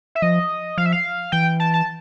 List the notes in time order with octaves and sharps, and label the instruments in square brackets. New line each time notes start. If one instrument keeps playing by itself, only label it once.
[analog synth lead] E5
[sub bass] F3 [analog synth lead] D#5
[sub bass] F3 [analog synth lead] F5
[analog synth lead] E5
F5
[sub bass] E3 [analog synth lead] G5
[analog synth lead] A5
A5